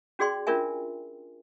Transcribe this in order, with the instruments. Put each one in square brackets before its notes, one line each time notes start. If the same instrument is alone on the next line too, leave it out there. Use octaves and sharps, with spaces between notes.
[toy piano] C#4 F#4 G#4 D5 G5 C6
C#4 D4 F4 A#4 E5 G#5